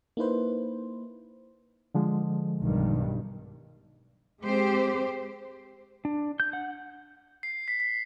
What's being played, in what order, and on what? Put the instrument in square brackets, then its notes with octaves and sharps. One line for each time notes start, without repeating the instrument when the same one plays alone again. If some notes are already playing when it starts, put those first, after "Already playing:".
[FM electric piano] A#3 D#4 E4 B4 C5
[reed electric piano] D3 F3 G#3
[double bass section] B1 G2 D#3
[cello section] G#3 C4 G4 C5
[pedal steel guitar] D4
G6
F#5
[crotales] C7
B6
B6